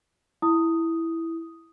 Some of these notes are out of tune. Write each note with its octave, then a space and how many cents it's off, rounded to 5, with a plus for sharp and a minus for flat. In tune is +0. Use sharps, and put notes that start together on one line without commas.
E4 +0 D#6 +0